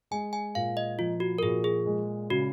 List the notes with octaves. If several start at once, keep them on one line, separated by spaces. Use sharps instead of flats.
G#3 G#5
G#5
A#2 F5
D#5
F3 F4
F#4
A#4
A#2 G#4
G#4
G#3
C#3 F#4